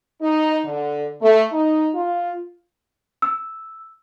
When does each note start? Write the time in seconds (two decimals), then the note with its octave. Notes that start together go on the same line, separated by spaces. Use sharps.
0.22 D#4
0.65 D3
1.22 A3
1.52 D#4
1.94 F4
3.22 E6